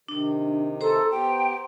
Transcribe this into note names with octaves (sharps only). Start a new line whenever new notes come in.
C3 D#3 D4
A4 C5 A#5 C6
B3 G4 G5